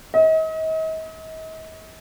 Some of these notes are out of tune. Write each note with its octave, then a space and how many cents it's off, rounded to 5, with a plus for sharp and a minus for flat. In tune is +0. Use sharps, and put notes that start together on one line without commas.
D#5 +40